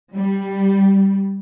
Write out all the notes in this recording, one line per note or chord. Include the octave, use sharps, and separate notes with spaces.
G3